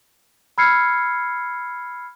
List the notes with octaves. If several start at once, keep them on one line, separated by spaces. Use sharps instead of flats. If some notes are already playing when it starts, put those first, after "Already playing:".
B5 E6 F6 G#6 C7 C#7